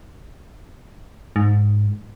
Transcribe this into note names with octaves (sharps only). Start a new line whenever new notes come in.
G#2